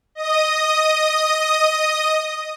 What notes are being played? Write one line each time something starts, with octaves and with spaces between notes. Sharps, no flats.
D#5 D#6